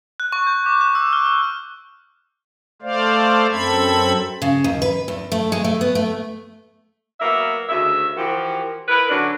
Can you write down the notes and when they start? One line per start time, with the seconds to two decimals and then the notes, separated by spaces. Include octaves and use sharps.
0.20 F#6
0.32 C#6
0.47 G6
0.66 D6
0.81 F#6
0.95 E6
1.13 F6
1.26 E6
2.82 A3 C5 D5 F5
3.51 F#2 C4 A4 B5 G#6
4.42 C#3
4.64 D#2
4.82 B4
5.08 E2
5.32 A3
5.52 G#3
5.64 A3
5.81 B3
5.95 A3
7.20 F#3 A#3 B3 E5
7.69 D2 C#3 D#5 E5
8.16 E3 F3 F#4 G4 A#4
8.88 E4 A#4 B4
9.10 D3 F#3 C#4 D4